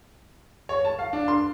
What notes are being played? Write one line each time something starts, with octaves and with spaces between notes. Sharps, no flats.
C#5
A5
F5
D4
C6